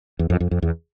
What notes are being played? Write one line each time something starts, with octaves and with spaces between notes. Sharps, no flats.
E2
F2
F2
F2
E2